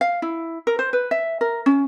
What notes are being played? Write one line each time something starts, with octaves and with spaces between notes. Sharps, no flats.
F5
E4
A#4
C5
B4
E5
A#4
C#4